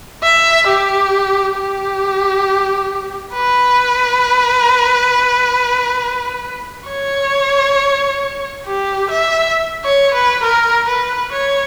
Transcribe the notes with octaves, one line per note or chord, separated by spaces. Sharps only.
E5
G4
G4
B4
C#5
G4
E5
C#5
B4
A#4
B4
C#5